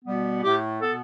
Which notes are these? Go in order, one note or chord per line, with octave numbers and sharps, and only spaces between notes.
B2 G3 B3
A2 A3 G4
B2 B3 A4